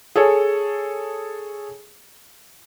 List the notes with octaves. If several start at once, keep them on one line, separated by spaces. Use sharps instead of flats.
G#4 A4 C#5